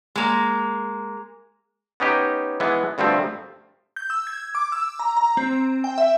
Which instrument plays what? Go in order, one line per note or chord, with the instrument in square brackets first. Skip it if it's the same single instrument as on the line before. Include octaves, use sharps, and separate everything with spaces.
[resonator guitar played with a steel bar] G#3 A#3
[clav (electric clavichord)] B3 C#4 D#4 G4
E3 G#3 B3
D2 G2 F3 A3 C4
[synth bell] G6
E6
G#6
D6
E6
A#5
A#5
C4
G5
E5